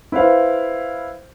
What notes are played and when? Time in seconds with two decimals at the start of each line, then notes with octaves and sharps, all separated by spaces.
0.12 E4 B4 C5 F5